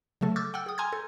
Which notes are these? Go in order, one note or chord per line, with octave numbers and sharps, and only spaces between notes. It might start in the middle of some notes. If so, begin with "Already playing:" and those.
C#3 F#3 A3 A4
C#6 D6 E6 F6 G6 A6
F#5 G5 E6 F6
G#4 D#6
G#5 A#5 C6 F6 G6 G#6
A4